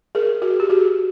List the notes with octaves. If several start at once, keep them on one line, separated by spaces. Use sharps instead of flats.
G#4 A#4
F#4 G#4
G4
F#4 G#4